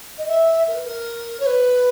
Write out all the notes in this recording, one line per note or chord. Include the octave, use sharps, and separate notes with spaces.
D#5
E5
A#4
B4
A#4
C#5
B4